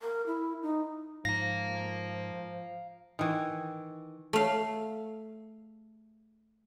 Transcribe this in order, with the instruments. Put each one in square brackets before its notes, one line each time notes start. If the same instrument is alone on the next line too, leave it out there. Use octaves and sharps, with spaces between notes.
[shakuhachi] A#4
E4
D#4
[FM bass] G#2 [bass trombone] F3 [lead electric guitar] F5 A#5 [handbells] A#6
[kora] D#3 E3
[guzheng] A3 F5